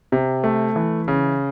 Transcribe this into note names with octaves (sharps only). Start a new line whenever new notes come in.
C3
A3
E3
C#3